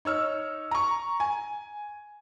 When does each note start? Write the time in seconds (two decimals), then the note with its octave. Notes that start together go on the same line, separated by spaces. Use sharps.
0.05 D#4 C#5 E6 F6
0.71 A#5 C#6
1.20 G#5